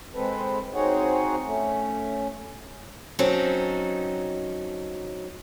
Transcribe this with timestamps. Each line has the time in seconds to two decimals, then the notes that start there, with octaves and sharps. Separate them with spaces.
0.14 G#3 C4 A4 B4
0.75 C4 D#4 F#4 G#4 C#5 F#5
1.45 A3 C#4
3.19 F#3 C4 C#4 D#4 A4